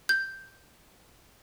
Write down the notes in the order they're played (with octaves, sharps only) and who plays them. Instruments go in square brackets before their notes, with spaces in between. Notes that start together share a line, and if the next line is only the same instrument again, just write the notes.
[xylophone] G6